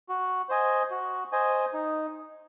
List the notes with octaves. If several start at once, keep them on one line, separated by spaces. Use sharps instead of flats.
F#4
C5 D#5 G#5
F#4
C5 D#5 G#5
D#4